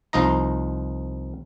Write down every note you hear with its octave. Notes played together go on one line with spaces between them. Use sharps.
C2 F3 D#4 D#5 A#5